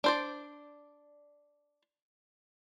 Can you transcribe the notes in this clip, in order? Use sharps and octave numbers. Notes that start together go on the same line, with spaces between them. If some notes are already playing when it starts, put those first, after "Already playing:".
D4 C5 D5